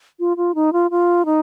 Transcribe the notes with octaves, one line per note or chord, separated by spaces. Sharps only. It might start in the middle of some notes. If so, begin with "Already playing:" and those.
F4
F4
D#4
F4
F4
D#4